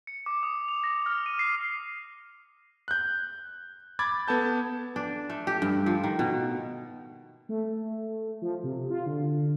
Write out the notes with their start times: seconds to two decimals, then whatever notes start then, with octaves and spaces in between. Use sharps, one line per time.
0.07 C#7
0.26 D6
0.43 D#6
0.68 F7
0.84 A#6
1.06 F6
1.26 D#7
1.39 C7
2.88 F#6 G6
3.99 B5 D6 G#6 A6
4.28 B3 A4 A5 G6
4.96 D4
5.30 A3
5.47 G4
5.62 G2
5.86 F3
6.04 D#3
6.19 B2
7.49 A3
8.42 F3
8.63 C3
8.90 F4
9.06 D3